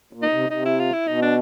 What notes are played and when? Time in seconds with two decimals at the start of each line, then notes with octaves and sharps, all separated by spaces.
0.13 A#2
0.22 D#4
0.32 C3
0.50 C3 D#4
0.65 E4
0.80 F4
0.93 E4
1.07 B2 D#4
1.22 D4